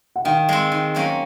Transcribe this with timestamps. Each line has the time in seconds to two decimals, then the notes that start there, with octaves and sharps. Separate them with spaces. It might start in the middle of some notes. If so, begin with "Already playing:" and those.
0.16 F#5
0.25 D#3 F5 G5
0.49 G#3 C4
0.72 D#3
0.95 F#3 A#3 C#4 F#4